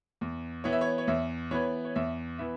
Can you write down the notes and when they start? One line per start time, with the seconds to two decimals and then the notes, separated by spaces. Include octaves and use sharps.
0.21 E2
0.64 E3 B3 C#5
0.72 E5
0.81 C#5
0.98 C#5
1.07 E2 E5
1.51 E3 B3 C#5
1.85 C#5
1.95 E2 E5
2.38 E3 B3 E5